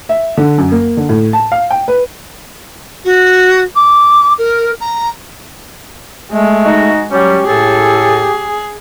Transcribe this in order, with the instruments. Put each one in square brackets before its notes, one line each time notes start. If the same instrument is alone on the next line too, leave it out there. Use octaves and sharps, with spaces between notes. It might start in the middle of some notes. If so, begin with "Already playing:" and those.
[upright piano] E5
D3
F#2
A#3
D3
A2
A5
F5
G5
B4
[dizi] F#4
D6
A#4
A#5
[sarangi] G#3 [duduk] A3
[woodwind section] D#4 F#4
[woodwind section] F#3 G3 [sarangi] C#4 [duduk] G4
[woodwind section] A2 A4 [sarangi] G#4